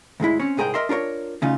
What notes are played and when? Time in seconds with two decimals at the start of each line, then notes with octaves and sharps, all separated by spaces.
0.20 D2 G#2 G#3 E4
0.40 C4 C#4 C#5
0.57 C2 G#2 G#4 A#4 C5 G5
0.74 A#4 D#5 E5 C6
0.89 D4 F4 A#4 C#5
1.42 D2 C#3 D#4 F4